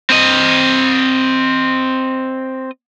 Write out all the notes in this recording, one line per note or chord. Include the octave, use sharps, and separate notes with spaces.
C4 D#5